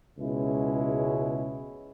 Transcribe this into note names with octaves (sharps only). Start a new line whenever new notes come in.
C#2 B2 G#3 C#4 E4